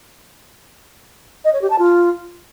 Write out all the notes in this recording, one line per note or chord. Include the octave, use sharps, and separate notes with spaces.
D#5
C#5
G4
A5
F4